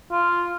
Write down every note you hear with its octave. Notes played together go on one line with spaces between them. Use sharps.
F4